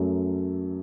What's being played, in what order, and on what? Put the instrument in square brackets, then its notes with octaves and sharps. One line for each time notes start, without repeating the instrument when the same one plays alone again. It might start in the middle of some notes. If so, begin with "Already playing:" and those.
Already playing: [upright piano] F#2 F#3 A3